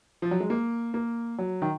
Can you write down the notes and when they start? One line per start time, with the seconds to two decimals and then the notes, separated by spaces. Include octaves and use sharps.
0.22 F3
0.31 F#3
0.40 G#3
0.50 A#3
0.94 A#3
1.38 F#3
1.62 D#3